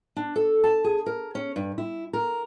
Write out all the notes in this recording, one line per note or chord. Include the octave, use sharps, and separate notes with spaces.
D4
A4
A5
G#4
A#4
C#4
G2
E4
A#4